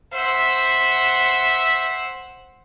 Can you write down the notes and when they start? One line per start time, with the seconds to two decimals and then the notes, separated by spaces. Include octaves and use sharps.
0.13 C5 E5 F#5